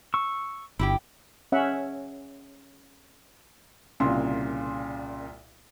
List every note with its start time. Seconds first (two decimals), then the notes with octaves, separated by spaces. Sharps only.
0.14 C#6 E6
0.79 G1 E4 G4 G5
1.52 C#4 E5 F#5
4.00 C2 A#2 C#3 C6